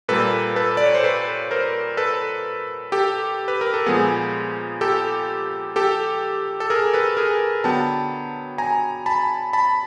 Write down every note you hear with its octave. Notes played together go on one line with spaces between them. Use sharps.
A#2 G3 A#3 A4 B4
A4 B4
D5
C#5
C5
A4 B4
A#4 C5
A4 B4
G4 A4
B4
A#4
A4
A#2 F3 G#3 B3 G#4
G4 A4
G4 A4
A4
G#4 A#4
A4 B4
G#4 A#4
D3 F#3 B3 G5 A5
G#5 A#5
A5 B5
A5 B5